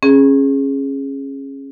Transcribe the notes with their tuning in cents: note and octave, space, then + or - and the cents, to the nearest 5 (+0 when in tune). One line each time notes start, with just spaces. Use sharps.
C#4 -20 G#4 +0